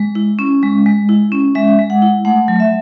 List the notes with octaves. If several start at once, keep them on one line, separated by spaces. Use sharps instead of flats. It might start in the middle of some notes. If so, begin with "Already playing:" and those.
Already playing: G#3
E4
C#4
G#3
G#3
E4
C#4
G#3 E5
G#3
F#5
E4
A3 F#5
F#3
E5